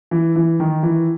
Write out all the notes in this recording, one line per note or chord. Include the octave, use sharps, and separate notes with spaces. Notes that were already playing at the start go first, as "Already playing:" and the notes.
E3
E3
D#3
E3